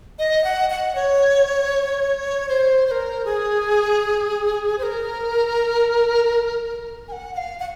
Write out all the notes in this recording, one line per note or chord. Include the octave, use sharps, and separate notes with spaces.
D#5
F#5
F#5
C#5
C5
C5
A#4
G#4
C5
A#4
G#5
F#5
F#5
F5
F#5